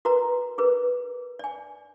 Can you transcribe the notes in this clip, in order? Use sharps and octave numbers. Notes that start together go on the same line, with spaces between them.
F#4 A#4 B4 A#5
G#4 A#4 B4
D5 G#5